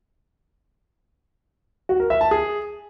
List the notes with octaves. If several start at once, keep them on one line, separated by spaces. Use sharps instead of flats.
F#4
A#4
E5
A5
G#4